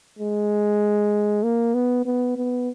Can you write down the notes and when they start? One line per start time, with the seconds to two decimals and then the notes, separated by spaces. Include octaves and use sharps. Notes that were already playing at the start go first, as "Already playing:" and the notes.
0.19 G#3
1.43 A#3
1.74 B3
2.06 B3
2.37 B3